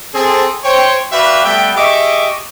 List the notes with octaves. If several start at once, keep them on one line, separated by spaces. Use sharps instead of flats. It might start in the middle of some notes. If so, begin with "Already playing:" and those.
C4 G#4 A4
C5 C#5 G5
F#4 B4 D5 E5 F5 G5
G3 A3 B3 E5 G5
G4 G#4 D#5 E5 C#6 D6